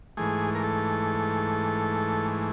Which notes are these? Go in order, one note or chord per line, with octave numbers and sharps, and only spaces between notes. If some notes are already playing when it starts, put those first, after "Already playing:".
G#2 E3 A3 G#4
A#4
A4